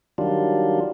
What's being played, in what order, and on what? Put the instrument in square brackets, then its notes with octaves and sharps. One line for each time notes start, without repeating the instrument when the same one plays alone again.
[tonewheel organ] D#3 F#3 G3 D4 F4